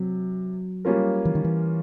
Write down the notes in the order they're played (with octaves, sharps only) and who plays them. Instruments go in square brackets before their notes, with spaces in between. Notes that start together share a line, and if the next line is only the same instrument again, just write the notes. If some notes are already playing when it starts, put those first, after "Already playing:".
Already playing: [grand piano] C3 [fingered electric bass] F#3
[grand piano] G3 A#3 C#4 F4 A#4
[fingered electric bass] E3
D#3
E3